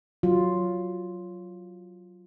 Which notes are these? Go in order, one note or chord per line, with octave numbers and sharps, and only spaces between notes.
F#3 F4